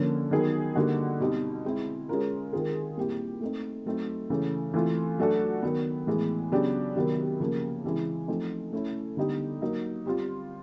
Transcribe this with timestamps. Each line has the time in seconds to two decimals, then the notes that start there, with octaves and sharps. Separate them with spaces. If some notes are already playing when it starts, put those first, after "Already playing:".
Already playing: D3 F3 A#3 C#4
0.31 D#3 F#3 B3 D#4 G#4
0.75 D3 G3 A#3 D#4 F#4
1.20 B2 G3 C4 D#4
1.64 G#3 C4 E4
2.09 G#3 C#4 F4 A#4
2.53 D#3 G#3 C4 F4 G#4
2.97 A#2 G3 C4 E4 G4
3.41 A3 C4 D#4
3.86 F#3 A3 C4 D#4
4.30 C#3 E3 A3 C#4
4.74 E3 A3 C4 F4
5.18 F#3 A3 D4 F#4 A4
5.63 D#3 F#3 B3
6.07 A2 E3 G#3 B3
6.51 C#3 F#3 B3 D4 G4
6.96 C3 D#3 F#3 B3
7.40 C#3 F3 A#3
7.84 C#3 E3 G#3 C4 E4
8.28 F3 A3 C4 D#4
8.73 A3 C#4 E4 A4
9.17 D3 G3 B3 D#4 G4
9.61 F#3 A#3 D#4
10.06 G3 C4 F4